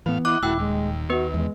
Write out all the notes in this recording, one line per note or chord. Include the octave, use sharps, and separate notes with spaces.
A2 E3 B3 F5
E4 D#5 F#5 D6 F#6
D#1 A3 E4 F#4 G5 E6
D#2 G#3
B3 F#4 B4
E2 G#3